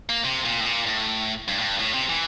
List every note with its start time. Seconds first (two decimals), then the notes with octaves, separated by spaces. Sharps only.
0.09 A#3
0.25 C3
0.45 A#2
0.61 A2
0.65 A#2
0.87 A2
1.48 G2
1.58 A2
1.64 G2
1.79 A2
1.94 C3
2.09 E3